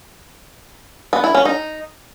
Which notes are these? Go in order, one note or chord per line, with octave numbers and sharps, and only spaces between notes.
B3
E4
C#4
D#4